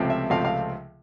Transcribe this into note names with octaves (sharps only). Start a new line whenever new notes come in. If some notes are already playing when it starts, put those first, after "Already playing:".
Already playing: C#2 C3 F3 A3 C4
E5
C#2 C3 F3 A3 C4 F5
F5